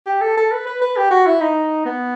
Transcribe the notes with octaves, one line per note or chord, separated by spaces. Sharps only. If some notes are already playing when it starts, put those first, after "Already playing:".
G4
A4
A4
B4
B4
B4
G4
F#4
E4
D#4
B3